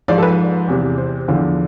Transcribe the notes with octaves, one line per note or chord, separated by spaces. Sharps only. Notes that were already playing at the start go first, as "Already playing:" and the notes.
G#2 F3 D5
A4
B4
E2 C3 E3
C5
E2 D3 F3